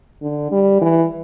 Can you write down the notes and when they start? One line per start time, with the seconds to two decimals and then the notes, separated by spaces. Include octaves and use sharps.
0.22 D3
0.52 G3
0.81 E3